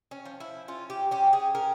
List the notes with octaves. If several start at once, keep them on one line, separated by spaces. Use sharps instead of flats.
C#4
F3
E4
C#4 F4
G4
C#4 G4
G#4
C#4 A#4